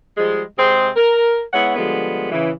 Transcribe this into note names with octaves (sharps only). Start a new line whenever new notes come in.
F3 G3 G#3
C3 G#3 C4 G#4 C5
A#4
G#3 B3 E4 C#5 F#5
D3 F3 G3 G#3 B3
C#3 E3